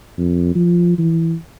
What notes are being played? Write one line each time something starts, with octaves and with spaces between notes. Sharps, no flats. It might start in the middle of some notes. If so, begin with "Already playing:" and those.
F2
F3
E3